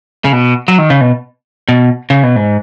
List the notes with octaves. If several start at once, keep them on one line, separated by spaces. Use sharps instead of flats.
C#3
B2
F#3
D#3
C#3
B2
B2
C#3
B2
G#2